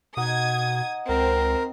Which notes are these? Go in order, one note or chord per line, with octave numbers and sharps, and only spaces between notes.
B2 D#4 D#5 F#5 D#6 G#6
C#2 C4 A#4